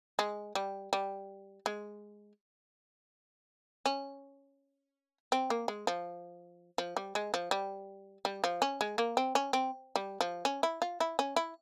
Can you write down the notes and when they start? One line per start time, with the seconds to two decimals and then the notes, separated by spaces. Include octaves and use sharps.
0.19 G#3
0.55 G3
0.93 G3
1.66 G#3
3.86 C#4
5.32 C4
5.50 A#3
5.68 G#3
5.87 F3
6.78 F3
6.97 G3
7.15 G#3
7.34 F3
7.51 G3
8.25 G3
8.44 F3
8.62 C#4
8.81 G#3
8.98 A#3
9.17 C4
9.35 C#4
9.53 C4
9.96 G3
10.21 F3
10.45 C#4
10.63 E4
10.82 F4
11.00 E4
11.19 C#4
11.36 E4